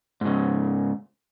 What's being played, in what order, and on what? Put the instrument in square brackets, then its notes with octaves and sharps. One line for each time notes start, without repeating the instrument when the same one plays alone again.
[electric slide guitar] G#2 C#3